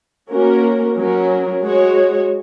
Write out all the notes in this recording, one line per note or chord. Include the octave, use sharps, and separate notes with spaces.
A#3 C#4 F#4 A#4
F#3 C#4 A#4
G#3 F#4 C#5